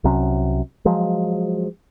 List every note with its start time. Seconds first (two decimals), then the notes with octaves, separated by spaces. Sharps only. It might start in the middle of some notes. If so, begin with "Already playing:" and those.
0.04 C2 C3 F#3 C#4
0.85 F3 F#3 G#3